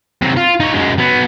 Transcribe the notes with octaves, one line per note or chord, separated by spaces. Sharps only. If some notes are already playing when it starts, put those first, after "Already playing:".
C3 F#3
F4
D#4 C#5
F#2 G#3
F#3 B3